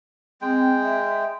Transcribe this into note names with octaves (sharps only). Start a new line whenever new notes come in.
G#3 C4 G5
E5